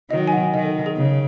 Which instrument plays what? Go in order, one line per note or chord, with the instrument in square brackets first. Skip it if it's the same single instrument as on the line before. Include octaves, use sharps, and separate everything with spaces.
[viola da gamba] D#3 F#3 [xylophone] D#5
[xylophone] G#5
F#5
[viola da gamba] D#3 [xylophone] D#5
[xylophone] A4
G#4
[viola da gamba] C#3